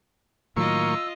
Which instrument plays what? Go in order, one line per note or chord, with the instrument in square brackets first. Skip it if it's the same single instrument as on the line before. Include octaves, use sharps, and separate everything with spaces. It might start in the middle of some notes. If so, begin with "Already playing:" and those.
[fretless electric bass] A2 D#3 F#3 [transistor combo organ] A#3 C#6 [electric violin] F4 D#5 [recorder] E6